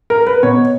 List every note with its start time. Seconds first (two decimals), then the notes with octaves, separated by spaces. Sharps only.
0.10 A#4
0.27 B4
0.43 B2 C#5